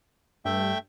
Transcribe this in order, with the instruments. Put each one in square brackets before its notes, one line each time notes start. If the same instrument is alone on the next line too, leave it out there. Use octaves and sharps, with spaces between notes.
[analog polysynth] G2 [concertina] A3 E5 G5